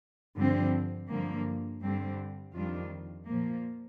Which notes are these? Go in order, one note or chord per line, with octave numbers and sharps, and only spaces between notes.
G2 D3 F3 C4
G2 D3 F3 A#3
G2 D3 G3 C4
F2 D#3 G3 D4 F4
A#2 F3 A#3